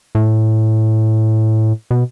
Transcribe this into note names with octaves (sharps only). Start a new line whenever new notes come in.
A2
B2